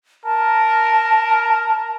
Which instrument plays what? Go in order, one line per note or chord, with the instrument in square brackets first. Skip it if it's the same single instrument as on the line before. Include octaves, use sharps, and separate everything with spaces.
[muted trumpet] A#4 [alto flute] A5